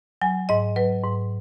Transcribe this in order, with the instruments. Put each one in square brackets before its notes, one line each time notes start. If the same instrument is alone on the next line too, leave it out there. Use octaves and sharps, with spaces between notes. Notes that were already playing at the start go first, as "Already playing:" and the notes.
[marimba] F#3 G#5
G#2 D#5
F#3 B4
G#2